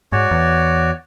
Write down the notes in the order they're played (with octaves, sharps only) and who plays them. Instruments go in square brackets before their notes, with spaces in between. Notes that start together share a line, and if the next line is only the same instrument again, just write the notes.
[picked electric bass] G#2 [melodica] F#4 C#5 D5
[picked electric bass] E2